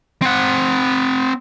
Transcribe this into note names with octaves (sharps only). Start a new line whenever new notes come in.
C4 F#5